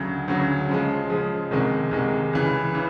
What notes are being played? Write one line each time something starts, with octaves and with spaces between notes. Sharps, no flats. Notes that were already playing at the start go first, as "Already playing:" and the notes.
Already playing: D2 C#3 F#3
D2 C#3 F#3
C#3 F3 G#3
C#3 F3 G#3
C2 C3 D#3 G#3
C2 C3 D#3 G#3
C#2 C#3 E3
C#3 E3